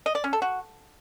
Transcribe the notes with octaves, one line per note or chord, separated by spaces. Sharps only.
D#5
D5
C#4
A4
F#4